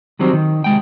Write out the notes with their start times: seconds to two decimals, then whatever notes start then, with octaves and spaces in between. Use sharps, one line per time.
0.19 D#3 F#3 G3 C4
0.33 D#3
0.64 C2 G#3 G5